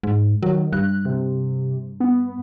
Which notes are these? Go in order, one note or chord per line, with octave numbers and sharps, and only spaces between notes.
G#2
D#3 F#3
G2 F#6
C3
B3